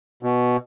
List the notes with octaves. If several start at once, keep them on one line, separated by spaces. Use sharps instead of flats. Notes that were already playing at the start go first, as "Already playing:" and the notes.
B2